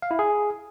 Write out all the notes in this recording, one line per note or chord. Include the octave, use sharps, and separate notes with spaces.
F5
E4
G#4